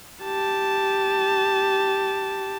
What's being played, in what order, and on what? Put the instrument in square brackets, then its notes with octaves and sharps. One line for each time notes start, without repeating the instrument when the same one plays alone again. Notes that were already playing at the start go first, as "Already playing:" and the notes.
[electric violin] G4 A5